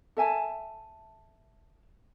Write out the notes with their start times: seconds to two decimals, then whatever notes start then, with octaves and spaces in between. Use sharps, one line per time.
0.17 A4 E5 G#5 A5